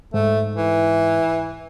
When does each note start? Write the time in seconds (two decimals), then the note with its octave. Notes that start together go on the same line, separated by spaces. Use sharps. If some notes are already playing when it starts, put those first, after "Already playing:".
0.14 G#2 A3
0.56 E3